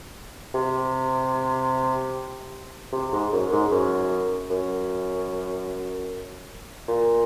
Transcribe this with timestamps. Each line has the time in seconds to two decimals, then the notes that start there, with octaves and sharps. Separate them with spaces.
0.54 C3
2.92 C3
3.12 G#2
3.32 F#2
3.51 G#2
3.71 F#2
4.50 F#2
6.88 A#2